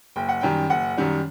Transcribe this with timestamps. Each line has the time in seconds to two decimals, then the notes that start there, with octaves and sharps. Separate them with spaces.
0.16 F#1 G5
0.29 F#5
0.41 F#2 D#3 G3 G5
0.70 F#1 F#5
0.97 F#2 D#3 G3